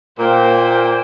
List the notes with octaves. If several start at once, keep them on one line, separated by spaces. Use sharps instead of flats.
A#2 A#3 C5 G5